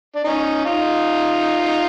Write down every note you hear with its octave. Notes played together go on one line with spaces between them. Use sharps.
D4
C#4 D#4
D#4 F4